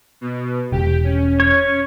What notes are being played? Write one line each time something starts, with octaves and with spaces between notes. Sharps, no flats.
B2
E1 G4
C#4
C#5